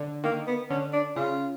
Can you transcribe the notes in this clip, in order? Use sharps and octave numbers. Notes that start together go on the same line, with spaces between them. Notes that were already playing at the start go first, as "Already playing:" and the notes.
Already playing: D3
D#3 A#3
B3
D3 C#4
D4
C#3 F4